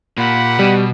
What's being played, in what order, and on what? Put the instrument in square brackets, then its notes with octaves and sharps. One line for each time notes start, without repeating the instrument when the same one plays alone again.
[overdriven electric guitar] A#2 [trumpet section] G4 F#5 B5
[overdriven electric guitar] B2 [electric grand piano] G3